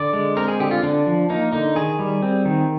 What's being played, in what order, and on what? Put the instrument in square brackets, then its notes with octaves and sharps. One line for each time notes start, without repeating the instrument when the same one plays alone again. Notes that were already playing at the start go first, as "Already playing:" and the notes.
Already playing: [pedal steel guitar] D3 D5
G#3
C4 A#4
G#4
D3 G4
F4
D3 D4
F3
A#3 D#4
D3 D#4
D#3 G#4
G3
C4
D#3